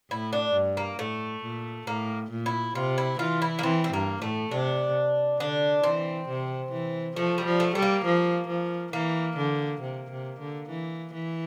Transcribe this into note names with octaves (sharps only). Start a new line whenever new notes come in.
A2 E4
D4
G2
A#3
A2 A3
A#2
A2 A#3
A#2
E4
C3 F4
E4
E3 F4
E4
A#3
E3 C4
C4
G2 A#3
A2 A3
C3 D4
D3 D4
E3 C4
C3
E3
F3 A3
G3
F3
A3
G3 A3
A#3
F3
F3
E3 A#3
D3
C3
C3
D3
E3
E3